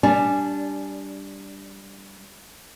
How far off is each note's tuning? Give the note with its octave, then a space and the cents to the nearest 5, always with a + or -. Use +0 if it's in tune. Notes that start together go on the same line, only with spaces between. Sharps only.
G3 +0 D4 -15 G#5 +0